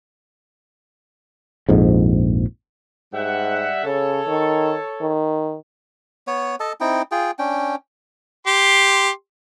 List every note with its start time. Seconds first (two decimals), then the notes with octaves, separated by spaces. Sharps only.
1.69 A#1 F2 G#2
3.13 G#2 G3 E5 F#5
3.84 C#3 A4 C#5
4.28 D#3
5.02 D#3
6.27 B3 C#5
6.60 A4 D#5 A5
6.81 C4 D#4 E4 G5
7.11 F4 G#4 G5
7.39 C#4 D4 G5
8.47 G4 C6